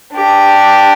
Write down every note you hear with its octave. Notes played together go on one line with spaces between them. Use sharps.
D4 G4